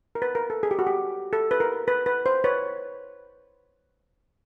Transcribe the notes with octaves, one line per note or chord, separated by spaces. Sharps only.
A#4
B4
A#4
A4
G#4
G4
F#4
G4
A4
B4
A#4
B4
B4
C5
B4 C#5